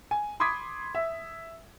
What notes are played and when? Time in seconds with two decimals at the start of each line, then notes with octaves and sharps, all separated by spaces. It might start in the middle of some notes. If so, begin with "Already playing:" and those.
0.11 G#5
0.40 B5 C6 D6 D#6 G#6 B6
0.95 E5